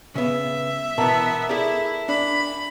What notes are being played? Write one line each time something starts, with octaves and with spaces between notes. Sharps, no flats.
C#3 B3 E5
B2 E3 B3 A#4 A5 A#5
E4 G#4 A4 D5
D4 B5